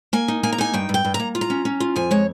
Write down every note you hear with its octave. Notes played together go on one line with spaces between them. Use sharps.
A#3 G#5
D#4
A#3 G#5
A#5
D#4 G#5
G2 G5
G2
G5
G2
A#5
A#3
F4
A#5
C#4
C#4
F4
F2 G#5
G#3 C#5